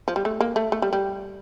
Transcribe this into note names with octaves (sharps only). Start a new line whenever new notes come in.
F3
G3
A3
A#3
A3
A3
G3
G3